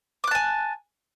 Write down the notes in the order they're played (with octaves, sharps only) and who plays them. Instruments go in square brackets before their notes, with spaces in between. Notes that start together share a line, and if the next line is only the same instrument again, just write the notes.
[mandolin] D6
F#6
A5
G#5